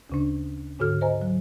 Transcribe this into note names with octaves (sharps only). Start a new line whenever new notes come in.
D2 C#3 D4
G#2 D3 F#4 A4 F6
C5 D#5 G#5 A#5
F#3